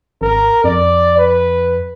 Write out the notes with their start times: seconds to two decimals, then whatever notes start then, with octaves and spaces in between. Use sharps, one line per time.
0.22 G#1 A#4
0.64 F2 D5
1.18 B4